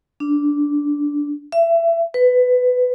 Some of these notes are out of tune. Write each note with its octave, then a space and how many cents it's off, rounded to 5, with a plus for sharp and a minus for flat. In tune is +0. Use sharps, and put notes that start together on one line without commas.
D4 -10
E5 +25
B4 +15